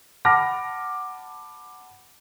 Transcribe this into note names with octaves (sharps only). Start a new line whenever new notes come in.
F#5 A5 B5 D6 F6 A#6